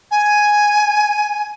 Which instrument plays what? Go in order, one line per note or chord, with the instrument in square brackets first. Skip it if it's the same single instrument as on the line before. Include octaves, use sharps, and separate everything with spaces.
[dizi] G#5